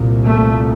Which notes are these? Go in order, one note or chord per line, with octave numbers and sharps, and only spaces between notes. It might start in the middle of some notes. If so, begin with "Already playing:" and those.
Already playing: C2 A#2
A3